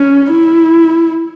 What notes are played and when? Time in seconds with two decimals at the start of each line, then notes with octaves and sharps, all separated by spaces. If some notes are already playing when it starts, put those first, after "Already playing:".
Already playing: C#4
0.31 E4